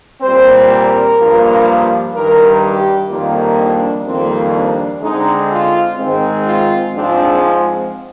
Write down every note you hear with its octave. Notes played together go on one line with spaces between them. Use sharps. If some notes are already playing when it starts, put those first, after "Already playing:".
A#2 G3 C4 C5
A#4
G2 F3 A#3
G2 D#3 G3 A#4
G4
F2 D#3 G3 A#3 F4
D4
F2 D#3 G3 A#3 C4
D4
D3 G#3 C4 D#4
F4
G#2 D#3 G#3 C4
F4
G#2 F3 G#3 C4 D4
C4